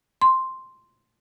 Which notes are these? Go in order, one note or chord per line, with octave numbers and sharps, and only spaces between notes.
C6